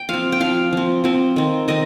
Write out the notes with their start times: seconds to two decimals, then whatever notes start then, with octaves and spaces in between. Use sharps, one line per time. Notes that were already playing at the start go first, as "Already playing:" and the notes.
Already playing: G5
0.09 F3 C4 F5
0.32 G5
0.40 F3 C4 F5
0.73 F3 C4
1.04 F3 C4
1.36 D#3 C4
1.68 D#3 C4 D#5